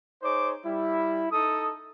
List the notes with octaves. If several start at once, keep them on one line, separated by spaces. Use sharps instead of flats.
D#4 G#4 C5 C#5 D6
G3 E4
D#4 A4 D#6